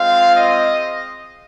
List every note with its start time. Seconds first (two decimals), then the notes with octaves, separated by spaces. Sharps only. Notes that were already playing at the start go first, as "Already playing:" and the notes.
Already playing: G#3 C4 F4 F5
0.36 D#5